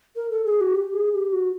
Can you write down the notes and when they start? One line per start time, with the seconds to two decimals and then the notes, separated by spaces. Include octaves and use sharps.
0.16 A#4
0.31 A4
0.45 G#4
0.61 F#4
0.75 G4
0.94 G#4
1.13 G4
1.33 F#4